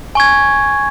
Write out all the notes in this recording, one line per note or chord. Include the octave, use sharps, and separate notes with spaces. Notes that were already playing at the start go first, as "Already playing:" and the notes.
G#5 C#6 G#6